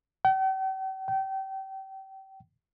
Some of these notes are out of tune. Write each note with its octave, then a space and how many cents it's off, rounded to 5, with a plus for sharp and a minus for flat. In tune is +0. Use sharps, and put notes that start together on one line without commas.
G5 -45
G5 -30